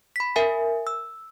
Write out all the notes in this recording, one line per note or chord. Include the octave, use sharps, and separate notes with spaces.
B5 B6
A#4 E5 G#5
E6